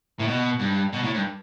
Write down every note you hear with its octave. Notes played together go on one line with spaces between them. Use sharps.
A2
B2
G2
B2
A2
G2